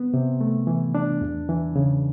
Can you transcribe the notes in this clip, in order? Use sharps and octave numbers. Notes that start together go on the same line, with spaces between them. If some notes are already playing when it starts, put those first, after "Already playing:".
Already playing: B3
C3
A3
E3
D4
E2
E3
C#3